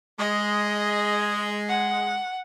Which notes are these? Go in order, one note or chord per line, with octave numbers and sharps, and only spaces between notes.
G#3 D#5
F#5